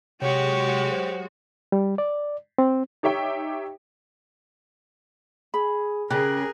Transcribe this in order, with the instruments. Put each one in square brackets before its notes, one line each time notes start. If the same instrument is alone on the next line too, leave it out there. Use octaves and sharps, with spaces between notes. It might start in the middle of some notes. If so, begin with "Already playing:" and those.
[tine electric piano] C3 [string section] F#3 G#3 F#4 [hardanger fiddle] G4 C#5
[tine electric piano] C5
[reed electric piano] G3
D5
C4
[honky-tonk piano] D#4 G4 C#5 E5 G5
[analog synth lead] G#4 [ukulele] B5
[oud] C#3 G4 [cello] G#4 A#4 [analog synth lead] F#6